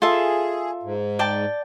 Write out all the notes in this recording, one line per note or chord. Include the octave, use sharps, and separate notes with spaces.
F4 G#4 A4 E5
G#2
D5 G5 A5